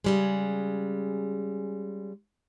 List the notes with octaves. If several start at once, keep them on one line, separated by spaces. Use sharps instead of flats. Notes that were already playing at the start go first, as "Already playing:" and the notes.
C#3 G3 G#3